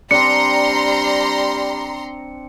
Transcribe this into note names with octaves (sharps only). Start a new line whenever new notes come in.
G3 C4 D4 A#5 C6 C#7